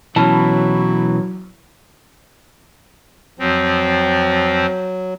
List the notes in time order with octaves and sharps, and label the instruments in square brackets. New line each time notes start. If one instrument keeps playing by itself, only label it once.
[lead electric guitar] B2 E3 [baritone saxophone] F#3 [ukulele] C#4 A5 [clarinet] E4
[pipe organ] F2 F3 C4 [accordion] F#3